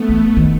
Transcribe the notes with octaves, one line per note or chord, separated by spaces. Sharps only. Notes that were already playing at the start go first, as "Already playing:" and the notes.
Already playing: A3 B3
E3
D#3